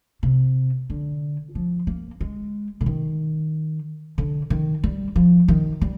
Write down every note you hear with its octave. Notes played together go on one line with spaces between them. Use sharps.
C3
D3
F3
A#3
G#3
D3
D#3
D3
D#3
G3
F3
D#3
G3